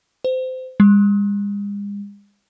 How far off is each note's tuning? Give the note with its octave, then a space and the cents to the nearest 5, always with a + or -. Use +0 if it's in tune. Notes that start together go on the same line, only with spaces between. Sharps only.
C5 -25
G#3 -45